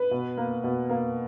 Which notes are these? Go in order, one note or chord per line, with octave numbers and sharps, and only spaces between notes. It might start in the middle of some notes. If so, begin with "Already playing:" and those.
Already playing: B4
B2
A#3
B2
A#3